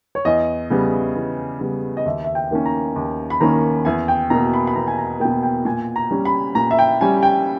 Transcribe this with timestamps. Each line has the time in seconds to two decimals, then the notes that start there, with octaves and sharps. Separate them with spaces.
0.15 C#5
0.25 E2 D#5
0.70 C#3 G3 B3
1.16 E2
1.60 C#3 G3 B3
1.97 D#5
2.06 D#2 E5
2.24 E5
2.35 G5
2.51 D#3 A#3 C#4
2.66 A#5
2.96 D#2
3.30 B5
3.40 D#3 A#3 C#4 A#5
3.85 E2 G#5
4.08 G5
4.30 B2 A#3 A#5
4.53 B5
4.67 B5
4.75 E2 A#5
4.87 G#5
4.98 A#5
5.20 A#3 G5
5.25 B2
5.43 G5
5.65 A#2 G#5
5.96 A#5
6.11 G3 C#4
6.25 B5
6.55 A#2 A#5
6.71 E5
6.79 G5
7.01 G3 C#4 G#5
7.23 G5